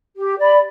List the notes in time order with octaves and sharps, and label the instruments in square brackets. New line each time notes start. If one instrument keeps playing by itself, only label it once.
[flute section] G4
D5 B5